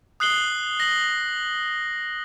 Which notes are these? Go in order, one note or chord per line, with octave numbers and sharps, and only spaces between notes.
D#6 F#6 C7 F#7 G7
A#6 F#7